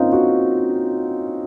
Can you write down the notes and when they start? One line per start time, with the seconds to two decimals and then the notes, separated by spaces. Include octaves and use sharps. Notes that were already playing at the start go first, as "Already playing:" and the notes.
Already playing: A#3 C4 C#4 D#4 F4
0.13 F#4